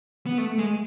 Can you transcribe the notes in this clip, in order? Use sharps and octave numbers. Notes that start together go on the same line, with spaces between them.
B3
A3
G#3